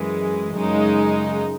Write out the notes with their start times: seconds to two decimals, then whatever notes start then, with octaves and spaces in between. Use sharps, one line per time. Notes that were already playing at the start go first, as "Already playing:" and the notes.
Already playing: F#2 E3 G#3
0.56 F#2 C#3 G#3 D#4